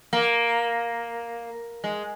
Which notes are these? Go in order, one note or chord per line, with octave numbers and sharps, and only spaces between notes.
A#3
G#3